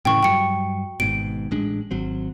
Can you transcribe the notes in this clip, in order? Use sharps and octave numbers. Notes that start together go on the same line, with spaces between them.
A2 C#3 E3 G5 C#6
G2 F#3 G5 C#7
G#1 G#2 B2 D7
A1 G#3 D4
G#1 F#3 C4